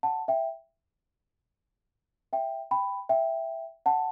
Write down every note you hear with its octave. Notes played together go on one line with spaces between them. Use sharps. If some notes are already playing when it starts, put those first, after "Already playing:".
F#5 A5
E5 G5
E5 G5
G5 B5
E5 G5
F#5 A5